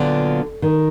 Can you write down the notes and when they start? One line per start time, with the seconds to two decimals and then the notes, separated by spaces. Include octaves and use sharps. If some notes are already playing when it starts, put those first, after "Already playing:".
Already playing: A#2 D3 F#3 B3 D4 F4
0.62 D#3